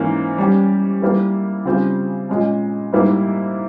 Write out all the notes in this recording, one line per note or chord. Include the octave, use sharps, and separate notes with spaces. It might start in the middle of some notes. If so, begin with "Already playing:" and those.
Already playing: G#2 E3 A#3 C#4
G3 C#4 G4
G3 A#3 E4 A#4
C#3 G3 C4 F4 G#4
A#2 G#3 C#4
G#2 G3 A#3 E4